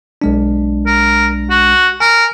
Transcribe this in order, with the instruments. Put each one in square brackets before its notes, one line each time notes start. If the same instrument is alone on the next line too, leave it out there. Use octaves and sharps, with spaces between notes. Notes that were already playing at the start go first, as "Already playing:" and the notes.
[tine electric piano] B1 G#3 D4
[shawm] A#4
F#4
[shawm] A#4 [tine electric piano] G#5